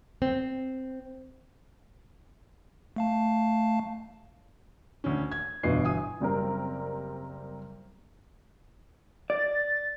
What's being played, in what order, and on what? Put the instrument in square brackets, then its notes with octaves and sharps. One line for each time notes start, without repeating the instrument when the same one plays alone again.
[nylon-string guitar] C4
[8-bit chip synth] A3 F5 A5
[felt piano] D2 C#4
G#6
[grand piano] G1 E3 C7 [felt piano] B2
[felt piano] G#5 D#6
[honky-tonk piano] F#1 G3 C4 A#4
[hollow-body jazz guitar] D5 [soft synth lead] A6